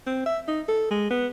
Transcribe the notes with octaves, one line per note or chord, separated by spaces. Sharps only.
C4
E5
D#4
A4
G#3
B3